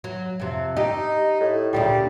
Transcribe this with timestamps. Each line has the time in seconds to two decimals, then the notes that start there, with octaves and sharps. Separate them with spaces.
0.04 F#3
0.40 F2 C3
0.77 D#4 G4
1.40 A2
1.73 D2 A#2 C#3 G3